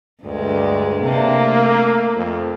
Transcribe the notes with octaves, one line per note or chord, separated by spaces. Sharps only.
D2 G2 G#3
C3 A#3 D4
A3
F2